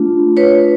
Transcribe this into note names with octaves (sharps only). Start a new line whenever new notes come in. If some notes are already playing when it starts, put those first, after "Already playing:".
Already playing: A3 D4 F4
B4 C#5